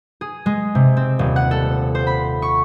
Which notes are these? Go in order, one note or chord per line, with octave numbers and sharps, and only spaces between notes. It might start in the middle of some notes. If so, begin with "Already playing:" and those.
G#4
G#3
C3
C4
D#1
F#5
A4
C5
B5
C#6